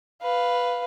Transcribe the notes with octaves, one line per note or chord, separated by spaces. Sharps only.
B4 F5